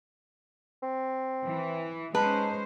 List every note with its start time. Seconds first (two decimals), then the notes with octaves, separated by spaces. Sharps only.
0.83 C4
1.44 E3
2.15 G#3 C#4 D#4 B4 C5 A5